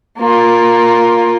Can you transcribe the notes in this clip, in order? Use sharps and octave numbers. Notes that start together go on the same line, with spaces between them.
A#3 F4